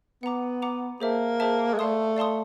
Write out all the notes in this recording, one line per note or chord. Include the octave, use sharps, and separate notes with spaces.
B3 F#5 A#5 D6
F#5 A#5 D6
A#3 G#4 C5 E5 A5
G#4 C5 E5 A5
G#3
A3 D5 F5 A5 C6 D#6
D5 F5 A5 C6 D#6